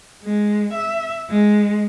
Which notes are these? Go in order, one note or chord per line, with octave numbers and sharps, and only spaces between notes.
G#3
E5
G#3